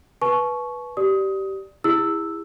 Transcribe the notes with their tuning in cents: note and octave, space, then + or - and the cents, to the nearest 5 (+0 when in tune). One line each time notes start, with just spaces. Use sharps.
B4 -10 A5 -40 C#6 +0
G4 -20 D5 +5 D#6 +20
E4 +0 G#4 -35 E6 +0